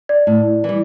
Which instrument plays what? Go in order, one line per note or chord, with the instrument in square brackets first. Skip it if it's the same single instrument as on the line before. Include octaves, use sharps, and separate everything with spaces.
[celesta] D5
[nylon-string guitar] A2
E3 G3